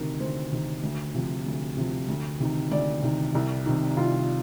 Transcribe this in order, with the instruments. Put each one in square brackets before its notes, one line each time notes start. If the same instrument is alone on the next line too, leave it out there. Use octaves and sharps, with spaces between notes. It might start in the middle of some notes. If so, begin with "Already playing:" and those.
Already playing: [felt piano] D2 C3 D#3 A#4
D2 C5
C3 D#3
D2
C3 F3
D2
C3 F3
D2
C3 D#3
D2 D5
C3 D#3
C2
C3 D#3
C2 F4